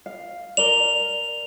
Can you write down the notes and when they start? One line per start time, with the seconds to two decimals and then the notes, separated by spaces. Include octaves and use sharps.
0.06 F5
0.57 A#4 D5 F7 G7